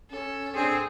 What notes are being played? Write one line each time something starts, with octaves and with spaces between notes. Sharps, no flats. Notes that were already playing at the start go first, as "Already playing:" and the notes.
C#4 A4
C4 D4 G#4